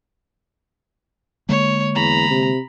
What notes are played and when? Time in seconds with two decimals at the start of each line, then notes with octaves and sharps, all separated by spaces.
1.49 D3 G#3 A#3 C#5
1.96 E2 A#5 B5
2.30 C3